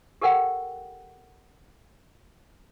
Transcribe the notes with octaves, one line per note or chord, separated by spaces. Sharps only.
G4 A4 A#4 D#5 F#5 G5